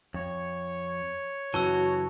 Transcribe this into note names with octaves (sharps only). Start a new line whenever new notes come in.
F2 C#5
F#2 C#3 E3 F#4 A5 C#6 E6